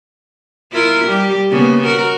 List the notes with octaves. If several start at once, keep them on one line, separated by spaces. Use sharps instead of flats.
E4 F4 A#4
G3 G4
C#3 A#3 B3
F#4 A#4